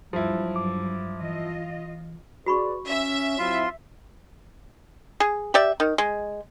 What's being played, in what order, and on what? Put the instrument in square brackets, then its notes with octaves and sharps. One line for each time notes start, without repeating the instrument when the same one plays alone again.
[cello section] G2 F#3 [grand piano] F3 E4
[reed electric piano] D6
[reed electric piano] E3 [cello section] F4 D#5
[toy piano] F#4 B5 C#6 [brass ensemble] G#4 B4 D5
[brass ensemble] C#4 [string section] E5
[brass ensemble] F#3 C4 E4 [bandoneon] F4 C6
[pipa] G#4
G4 D5 E5
D#3
G#3